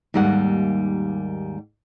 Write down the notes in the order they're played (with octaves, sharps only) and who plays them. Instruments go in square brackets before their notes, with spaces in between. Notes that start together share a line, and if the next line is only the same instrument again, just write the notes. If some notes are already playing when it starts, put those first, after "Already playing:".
[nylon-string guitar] D#2 G#2 G3 A#3 F#5